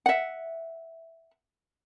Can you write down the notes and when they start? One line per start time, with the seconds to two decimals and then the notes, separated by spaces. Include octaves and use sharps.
0.06 E5 F#5